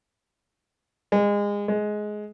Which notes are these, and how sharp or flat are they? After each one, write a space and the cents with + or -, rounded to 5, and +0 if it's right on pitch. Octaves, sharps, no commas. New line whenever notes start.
G#3 -25
G#3 +15